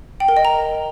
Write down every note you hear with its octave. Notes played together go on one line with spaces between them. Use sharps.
G5
A#4
D#5
A#5